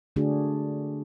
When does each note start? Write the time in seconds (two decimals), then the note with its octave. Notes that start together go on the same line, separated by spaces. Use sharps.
0.16 D3 A3 D4 F#4 G#4